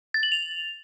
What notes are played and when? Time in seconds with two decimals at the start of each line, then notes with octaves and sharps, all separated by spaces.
0.14 A6
0.23 F#7
0.32 F7